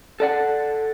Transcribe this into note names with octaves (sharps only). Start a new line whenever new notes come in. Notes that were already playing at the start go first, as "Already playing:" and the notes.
A4 D5 F#5